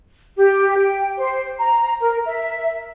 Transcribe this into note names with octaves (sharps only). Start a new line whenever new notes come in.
G4
G5
C5
A#5
A#4
E5